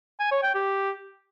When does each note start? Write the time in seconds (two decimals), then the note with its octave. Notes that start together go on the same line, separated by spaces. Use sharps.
0.20 G#5
0.31 C#5
0.43 G5
0.55 G4